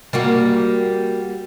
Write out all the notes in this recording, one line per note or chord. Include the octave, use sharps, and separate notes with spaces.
G3 A#3 F#4